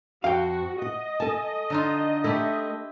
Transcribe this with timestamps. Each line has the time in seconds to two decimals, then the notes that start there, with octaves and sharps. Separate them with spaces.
0.24 F2 F#4 F5 G5
0.82 D#5 F#5
1.20 A4 G#5 A5
1.70 D3 D#4 F4
2.24 A3 E4 G4 A4